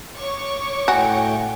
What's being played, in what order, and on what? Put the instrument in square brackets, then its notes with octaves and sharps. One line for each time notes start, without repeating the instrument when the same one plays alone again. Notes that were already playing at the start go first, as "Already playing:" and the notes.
[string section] C#5 C#6 D6
[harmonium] A2 G5 [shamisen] F#4 [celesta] G#5